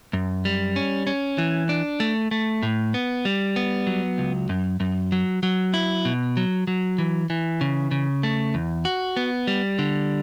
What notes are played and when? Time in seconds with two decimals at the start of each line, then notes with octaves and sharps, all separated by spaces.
0.13 F#2
0.45 G3
0.76 C#4
1.07 C#4
1.38 E3
1.69 D4
2.00 A3
2.31 A3
2.63 A2
2.94 B3
3.25 G3
3.56 B3
3.87 F#3
4.18 C#2
4.49 F#2
4.80 F#2
5.12 F#3
5.43 F#3
5.74 E4
6.05 B2
6.37 F#3
6.67 F#3
6.98 E3
7.30 E3
7.61 C#3
7.91 C#3
8.23 A3
8.54 E2
8.85 F#4
9.17 B3
9.47 G3
9.79 D3